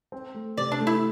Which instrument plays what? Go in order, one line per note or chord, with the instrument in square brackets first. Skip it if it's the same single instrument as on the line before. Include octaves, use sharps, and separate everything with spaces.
[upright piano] C4
A3
[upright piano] C3 [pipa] D5
[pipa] D4
[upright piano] A3
[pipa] E4